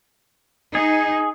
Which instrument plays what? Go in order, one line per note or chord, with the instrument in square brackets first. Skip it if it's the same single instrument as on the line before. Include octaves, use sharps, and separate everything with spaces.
[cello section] D#4 [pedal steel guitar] G#4